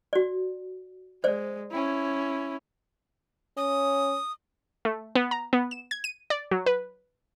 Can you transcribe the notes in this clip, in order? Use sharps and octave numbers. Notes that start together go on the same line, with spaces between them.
F#4 D5
G#3 C5 D5
C#4 E4
C#4 D#6
A3
B3
A#5
B3
E7
G#6
D#7
D5
F#3
B4